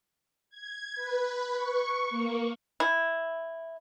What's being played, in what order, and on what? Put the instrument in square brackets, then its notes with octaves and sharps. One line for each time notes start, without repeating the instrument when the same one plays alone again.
[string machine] G#6
B4
C#6
A#3
[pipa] E4